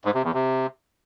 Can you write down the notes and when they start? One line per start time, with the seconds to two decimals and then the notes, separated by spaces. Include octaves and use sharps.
0.05 G#2
0.15 C3
0.24 E2
0.34 C3